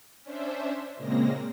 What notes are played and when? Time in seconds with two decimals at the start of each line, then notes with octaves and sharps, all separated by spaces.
0.22 C#4 D4 C5 E5
0.96 A#2 C#3 G#3 A#3 C4 A#6